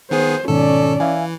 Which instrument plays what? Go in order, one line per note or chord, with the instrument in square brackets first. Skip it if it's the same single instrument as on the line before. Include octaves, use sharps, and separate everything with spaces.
[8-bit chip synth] D#3 B3 G#4 [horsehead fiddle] C5
[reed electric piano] G#2 B2 D#3 [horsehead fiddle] C#4 D5 [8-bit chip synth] A4
[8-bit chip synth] E3 [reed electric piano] E5 F5 G#5